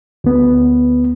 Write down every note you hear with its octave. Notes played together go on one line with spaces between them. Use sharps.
D2 B3